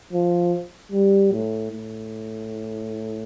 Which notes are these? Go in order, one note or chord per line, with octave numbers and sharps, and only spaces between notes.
F3
G3
A2
A2